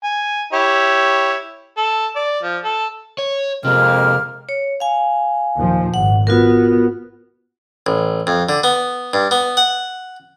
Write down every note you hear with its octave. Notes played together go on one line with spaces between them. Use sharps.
G#5
E4 G4 C#5
A4
D5
F3
A4
C#5
F2 C3 G#3 A#3 F6
C#5
F5 G#5
D#2 A#2 F3
G#1 F#5
B3 F4 F#4 A#4
A1
F2
D3
B3
G2
B3
F#5